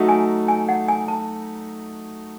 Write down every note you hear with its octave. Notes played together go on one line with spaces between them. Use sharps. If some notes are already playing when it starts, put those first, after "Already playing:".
Already playing: F#3 A3 D#4 F#4
G#5
G#5
F#5
G#5
A5